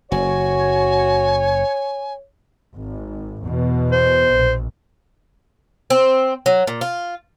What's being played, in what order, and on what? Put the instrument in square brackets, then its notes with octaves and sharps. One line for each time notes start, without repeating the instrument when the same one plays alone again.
[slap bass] F#1 [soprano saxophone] F#4 [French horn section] C#5 [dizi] G#5
[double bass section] G#1
E2 B2
[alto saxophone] C5
[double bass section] A#1
[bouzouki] C4
F#3
A#2
F4